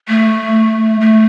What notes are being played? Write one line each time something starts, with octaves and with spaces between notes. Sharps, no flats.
A3
A3